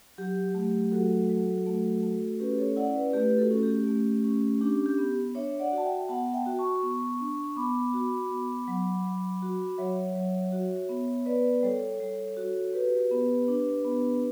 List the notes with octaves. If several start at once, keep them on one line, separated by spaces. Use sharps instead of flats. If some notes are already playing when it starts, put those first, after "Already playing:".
F#3 G4
A3 G4
F#3 F#4 A4
F#3
A3
A3
C#4 G4 B4
A4 C#5
E4 D5 F#5
B4 D5
A3 G4 B4
F#4 A4
C#4
G4
A3
C#4
D4 G4
G4
B3
D4 C#5 E5
D5 F#5
F#4
A5
E5 G5
B3 F#5 A5
E5 G5
F#4
A5 C#6
B3
D4
B3 B5 D6
F#4
B3
F#3
F#3
F#4
F#3 C#5 E5
F#3
F#4
B3
B3 B4 D5
G3 A4 C#5
G3
F#4
F#4 G4 B4
B3
D4
B3